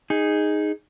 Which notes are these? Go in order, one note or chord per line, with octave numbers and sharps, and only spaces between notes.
D#4 G#4